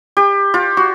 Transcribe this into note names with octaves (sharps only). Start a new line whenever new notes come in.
G4
F4
F#4